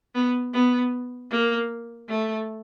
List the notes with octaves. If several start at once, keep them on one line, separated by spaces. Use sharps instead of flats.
B3
B3
A#3
A3